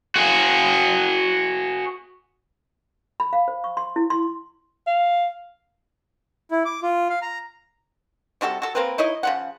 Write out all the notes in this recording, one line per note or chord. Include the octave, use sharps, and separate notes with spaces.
F#4 G#4
B5
F5
C5
C#6
C6
E4
C6
F5
E4
D6
F4
F5
A#5
C3 G3 F#4 A4
F#4 A4
A#3 C4 A#4 B4
D#4 E4 C#5 D#5
C#3 F3 F#5